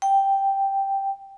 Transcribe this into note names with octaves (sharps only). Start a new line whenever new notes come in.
G5